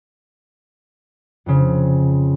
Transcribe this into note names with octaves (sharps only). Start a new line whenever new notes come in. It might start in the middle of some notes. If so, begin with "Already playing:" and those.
F2 C#3